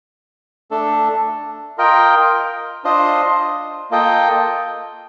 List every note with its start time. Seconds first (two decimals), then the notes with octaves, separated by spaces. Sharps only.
0.71 A3 D4 A4
1.78 F4 A#4 D#5 G5
2.84 D4 F4 C5 D#5
3.90 A#3 F4 A4 D#5 G5